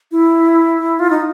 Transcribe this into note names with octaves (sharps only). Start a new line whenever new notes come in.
E4
F4
D#4